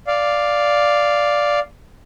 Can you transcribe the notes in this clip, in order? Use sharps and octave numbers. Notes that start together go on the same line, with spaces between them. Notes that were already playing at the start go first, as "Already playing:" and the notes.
D5 F5